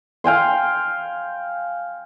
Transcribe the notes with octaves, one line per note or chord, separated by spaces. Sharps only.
F5 G5 G#5 C6